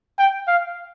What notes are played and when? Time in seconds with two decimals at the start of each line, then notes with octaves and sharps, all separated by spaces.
0.18 G5
0.47 F5